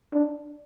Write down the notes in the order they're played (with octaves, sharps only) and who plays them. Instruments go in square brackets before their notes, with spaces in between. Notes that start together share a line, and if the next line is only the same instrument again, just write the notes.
[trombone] D4